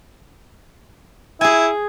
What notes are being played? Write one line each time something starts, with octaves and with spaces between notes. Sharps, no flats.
E4 G#4 G#5